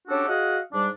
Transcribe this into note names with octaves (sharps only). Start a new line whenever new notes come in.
C#4 D4 F#4 G4 A4
F#4 G#4 D#5 F5 F#5
G#2 G3 D4